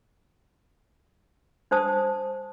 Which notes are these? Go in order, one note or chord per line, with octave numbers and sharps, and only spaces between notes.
D4 C5 A5 D#6